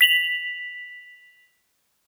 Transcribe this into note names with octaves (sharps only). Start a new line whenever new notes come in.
B6 F7 F#7